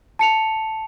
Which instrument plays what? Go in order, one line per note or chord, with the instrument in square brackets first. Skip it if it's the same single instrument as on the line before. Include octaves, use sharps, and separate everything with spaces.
[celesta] A5 C#7 F7